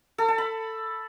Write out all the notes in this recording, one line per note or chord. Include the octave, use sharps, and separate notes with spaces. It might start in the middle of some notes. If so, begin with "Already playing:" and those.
A4
A5
B5